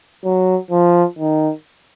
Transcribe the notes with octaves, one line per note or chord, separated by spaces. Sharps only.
F#3
F3
D#3